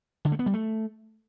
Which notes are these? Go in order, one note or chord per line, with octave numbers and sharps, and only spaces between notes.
D3
A3
B3
G3
A3